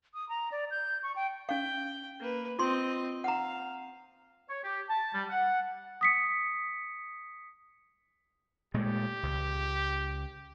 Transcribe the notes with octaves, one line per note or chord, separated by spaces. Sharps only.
D#6
A#5
D5
G6
C#6
G5
C#4 F5 G5
A#3 B4
C4 F4 D#5 C6
F5 F#5 A#5
C#5
G4
A5
G3
F#5
D#6 B6 C#7
A#2 G#3 A3 G4
C#2